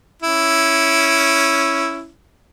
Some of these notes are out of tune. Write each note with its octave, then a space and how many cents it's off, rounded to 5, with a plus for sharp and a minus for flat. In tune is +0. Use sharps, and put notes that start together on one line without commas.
C#4 +0 E4 +5